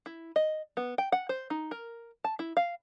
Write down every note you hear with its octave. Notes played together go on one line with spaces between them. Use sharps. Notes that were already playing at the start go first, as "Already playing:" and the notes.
E4
D#5
B3
G5
F#5
C5
D#4
A#4
A5
E4
F5